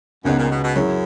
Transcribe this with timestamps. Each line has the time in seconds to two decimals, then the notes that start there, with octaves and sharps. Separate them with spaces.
0.24 C#2 F#2 C#3 G#3 B3 D#4
0.38 A#2
0.51 B2
0.63 B2
0.75 F#2 F#3 C#4 E4 G#4